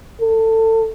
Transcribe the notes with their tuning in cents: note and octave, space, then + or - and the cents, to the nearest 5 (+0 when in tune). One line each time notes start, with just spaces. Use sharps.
A4 +25